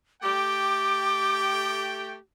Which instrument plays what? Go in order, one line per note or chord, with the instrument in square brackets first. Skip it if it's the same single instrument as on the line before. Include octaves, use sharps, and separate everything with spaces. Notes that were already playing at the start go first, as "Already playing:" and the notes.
[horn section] A3 G4 G5 [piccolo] D6